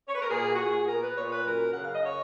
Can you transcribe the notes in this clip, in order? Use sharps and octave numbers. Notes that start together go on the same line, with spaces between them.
C#5
B4
A#4
A#2 G#4
F#4
A#2 G#4
B3 A#4
B4
A#2 C#5
B4
F#2 A#4
C#3 F#5
F5
D#5
C#5